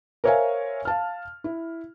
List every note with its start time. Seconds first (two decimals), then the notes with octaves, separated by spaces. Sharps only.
0.24 A#4 C5 C#5 E5 F5 G#5
0.85 F5 A5 F6
1.44 E4